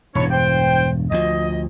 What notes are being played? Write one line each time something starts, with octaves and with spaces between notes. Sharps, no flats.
E1 G2 D4 E4 C#5
C5 G5
D2 F3 D#5